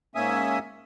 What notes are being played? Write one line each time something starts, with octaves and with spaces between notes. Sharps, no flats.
G#2 A#3 C#4 E5 G#5 D#6